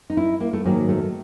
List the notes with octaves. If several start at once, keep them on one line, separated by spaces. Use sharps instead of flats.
D#4
E4
A#3
A3
G#2 D#3 F#3 A#3
A3